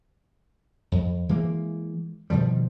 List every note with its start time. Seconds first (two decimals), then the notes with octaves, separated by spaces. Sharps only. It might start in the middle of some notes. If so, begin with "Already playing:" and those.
0.92 F2
1.29 E3 G#3 A#3
2.30 B2 D#3 F3 G3